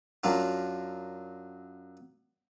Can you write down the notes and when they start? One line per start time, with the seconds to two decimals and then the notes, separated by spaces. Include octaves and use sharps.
0.24 F#2 F#3 D4 F4